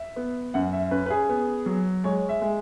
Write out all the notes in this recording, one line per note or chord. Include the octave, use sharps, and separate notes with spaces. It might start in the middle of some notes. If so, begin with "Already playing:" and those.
Already playing: E5
B3
F#2 F#5
E5
C#4 B4
B4
G#4
B3
F#3
G#3 C#5
E5
G#3